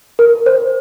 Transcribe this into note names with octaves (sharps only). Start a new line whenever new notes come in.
A#4
C5